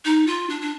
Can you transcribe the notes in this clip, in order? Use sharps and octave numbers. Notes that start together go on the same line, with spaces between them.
D#4
F4
D4
D4